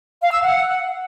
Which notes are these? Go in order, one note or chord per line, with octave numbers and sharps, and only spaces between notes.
F5
E6
F#5